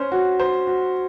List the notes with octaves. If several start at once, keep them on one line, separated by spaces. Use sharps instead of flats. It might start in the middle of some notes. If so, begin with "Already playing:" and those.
Already playing: C#4 C5
F#4
C5
F#4